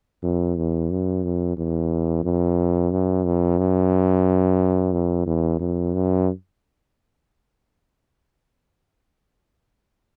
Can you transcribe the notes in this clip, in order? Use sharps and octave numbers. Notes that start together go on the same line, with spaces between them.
F2
E2
F#2
F2
E2
F2
F#2
F2
F#2
F2
E2
F2
F#2